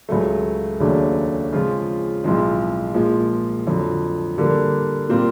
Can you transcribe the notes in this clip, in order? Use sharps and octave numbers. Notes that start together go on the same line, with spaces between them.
C#2 C#3 F#3 A3
D#2 C#3 F#3 A3 D4
C#3 F3 G#3 C4 F4
B1 A2 F3 G#3 C4
A#2 F3 G#3
F2 D3 F#3
D3 G3 A#3
A#2 G3 C4 F4 A#4